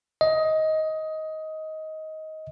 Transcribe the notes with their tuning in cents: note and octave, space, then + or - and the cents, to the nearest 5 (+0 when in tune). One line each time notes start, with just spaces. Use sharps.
D#5 +15